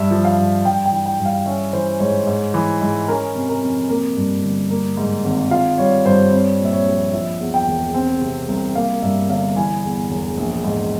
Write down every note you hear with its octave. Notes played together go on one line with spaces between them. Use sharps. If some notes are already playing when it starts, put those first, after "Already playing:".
Already playing: G2 E5
F3
F5
G2
G2 G5
G5
E3
G5
G2
F5
C#4 E5
E3 C5
G#2 C#5
G#2
E3
G#2
C#4 A#4
C3
A#4
F2
A#3 A#4
G2
G1
A#3
G#2
G#1
F4 F5
G3 C#5
G2 C5
C4 C#5
A#2
E5
C#5
A#1
F3 E5
E2
G5
E1
C4
C3
C2
A#3 F5
G2 E5
G1 F5
E3 G#5
E2
E1
A#1
G#2